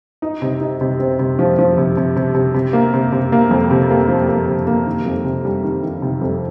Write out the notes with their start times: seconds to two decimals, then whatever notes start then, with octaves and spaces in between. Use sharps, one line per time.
0.22 D#4
0.42 C3
0.61 D#4
0.81 C3
1.00 C4
1.19 C3
1.39 F3
1.58 F3
1.78 C3
1.97 C3
2.16 C3
2.35 C3
2.54 C3
2.73 A#3
2.94 C3
3.12 C3
3.32 A#3
3.51 F2
3.71 C3
3.90 A#3
4.09 F3
4.28 A#3
4.48 C3
4.67 A#3
4.86 D#3
5.06 F2
5.25 C3
5.45 G3
5.64 D#3
5.83 D#3
6.02 C3
6.21 F2